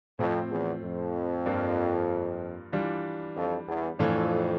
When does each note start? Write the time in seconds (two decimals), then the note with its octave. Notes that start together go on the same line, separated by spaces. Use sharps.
0.19 F2 A2 F3 C4
0.50 E2
0.82 F2
1.46 G2 F3 A#3 D4 F4
2.72 E3 G3 D4 F4
3.36 F2
3.68 E2
3.99 F2 A2 E3 A3 D4 F4